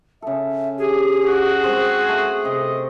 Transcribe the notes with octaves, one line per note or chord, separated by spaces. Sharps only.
C#3 A4 E5
G4 G#4
F#4
G#3 C4 C5
A3
C3 A4 D#5